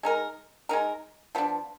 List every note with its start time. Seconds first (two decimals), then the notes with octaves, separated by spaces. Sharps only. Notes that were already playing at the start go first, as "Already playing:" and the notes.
0.03 G#3 D#4 A#4
0.69 G#3 D#4 A#4
1.35 F3 B3 D4